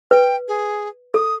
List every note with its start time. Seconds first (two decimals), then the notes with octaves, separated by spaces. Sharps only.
0.11 B4 G5
0.48 G#4
1.14 A4 D#6